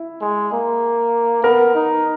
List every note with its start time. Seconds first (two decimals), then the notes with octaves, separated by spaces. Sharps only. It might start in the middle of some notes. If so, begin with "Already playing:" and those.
Already playing: E4
0.21 G#3
0.52 A#3
1.43 B3 A#4
1.75 D#4